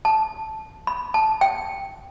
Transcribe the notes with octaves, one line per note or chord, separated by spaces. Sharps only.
A5
B5
A5
G5